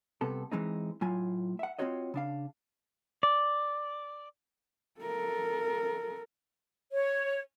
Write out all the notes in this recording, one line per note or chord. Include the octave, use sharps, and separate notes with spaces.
C2 C3 B3 A4
E3 G#3 C4 D#4
A2 F#3 F4 G#5
E5 F#5
C4 C#4 F4 F#4 C#5 D#5
C#3 D4 F5
D5
A4 A#4
C#5